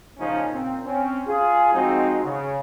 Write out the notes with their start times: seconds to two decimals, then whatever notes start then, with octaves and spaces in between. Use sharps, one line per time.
0.19 A#2 C#3 F3 C#4 D#4
0.52 A#2 C4
0.83 C4 C#4
1.27 F4 G#4
1.73 F3 G#3 C4 D#4 F#4
2.24 C#3